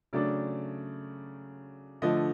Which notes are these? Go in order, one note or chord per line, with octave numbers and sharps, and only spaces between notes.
C#3 F#3 A3 D4 D5
D3 F3 A3 D#5